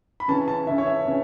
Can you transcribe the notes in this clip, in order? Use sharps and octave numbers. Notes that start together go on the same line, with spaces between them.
B5
C#3 E3 C#4 A5
A5
C#3 E3 C#4 E5
C#5
E5
C#3 E3 C#4